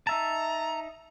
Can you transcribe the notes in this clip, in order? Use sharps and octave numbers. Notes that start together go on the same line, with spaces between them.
D#4 E5 A5 A#5